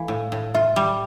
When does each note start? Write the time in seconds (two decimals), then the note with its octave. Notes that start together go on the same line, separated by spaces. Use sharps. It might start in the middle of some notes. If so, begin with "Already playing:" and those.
Already playing: E3 A3 F5
0.08 A2
0.32 A2
0.55 F4 E5
0.76 G3